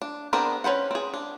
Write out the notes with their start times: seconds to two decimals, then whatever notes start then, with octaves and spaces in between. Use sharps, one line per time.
0.02 D4
0.33 B3 C4 D4 G#4 A#4
0.64 C#4 B4 C5 F#5
0.91 C4 G#4
1.14 D4